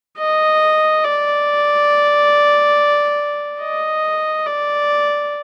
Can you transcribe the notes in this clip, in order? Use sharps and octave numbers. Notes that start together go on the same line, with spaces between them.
D#5
D5
D#5
D5